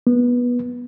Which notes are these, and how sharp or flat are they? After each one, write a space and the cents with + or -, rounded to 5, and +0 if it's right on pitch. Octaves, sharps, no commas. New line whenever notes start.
B3 -15